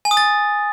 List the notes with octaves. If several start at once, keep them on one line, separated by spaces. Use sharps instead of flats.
G#5
D#6
A6